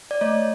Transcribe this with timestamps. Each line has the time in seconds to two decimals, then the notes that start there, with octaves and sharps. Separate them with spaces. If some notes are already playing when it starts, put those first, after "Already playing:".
0.11 D5
0.21 A3 C#5 D#5